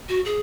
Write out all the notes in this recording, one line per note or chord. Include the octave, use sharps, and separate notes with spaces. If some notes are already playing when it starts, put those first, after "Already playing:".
F#4
G#4